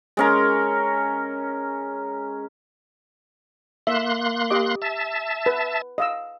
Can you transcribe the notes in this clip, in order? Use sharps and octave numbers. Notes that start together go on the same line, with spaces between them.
G#3 C#4 A#4
A#3 E5 C6 F#6
G4 D#5 D6
E5 A5
B4
D#5 F5 E6